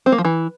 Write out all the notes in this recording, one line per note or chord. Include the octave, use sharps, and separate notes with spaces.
C4
A#3
F3
E3